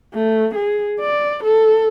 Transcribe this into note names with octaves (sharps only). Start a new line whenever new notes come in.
A3
G#4
D5
A4